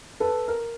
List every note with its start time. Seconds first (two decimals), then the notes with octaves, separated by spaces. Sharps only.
0.20 A4 B4
0.48 A#4